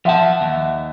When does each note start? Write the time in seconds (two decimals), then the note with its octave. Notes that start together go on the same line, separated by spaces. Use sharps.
0.05 F3 E5 F#5 A5
0.41 D#2